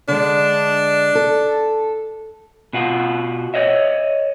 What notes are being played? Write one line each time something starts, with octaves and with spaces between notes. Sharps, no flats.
D3 G#3 D4
A4
B2 F4 F#4
C#5 D#5 E5